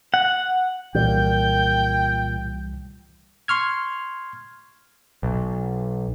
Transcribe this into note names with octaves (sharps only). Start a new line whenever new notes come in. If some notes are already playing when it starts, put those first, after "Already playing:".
F#5
C2 A#2 E3 G3 G5 G6
C6 C#6 F6 G#6
B1